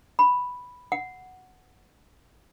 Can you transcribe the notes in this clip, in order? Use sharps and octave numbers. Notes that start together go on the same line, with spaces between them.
B5
F#5